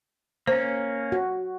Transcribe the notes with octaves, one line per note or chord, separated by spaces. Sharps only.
A#3 C#4 C5
F#4